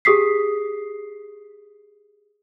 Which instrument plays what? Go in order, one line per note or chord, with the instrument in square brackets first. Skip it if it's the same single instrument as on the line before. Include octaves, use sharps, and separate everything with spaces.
[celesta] G4 G#4 D#6 B6 C7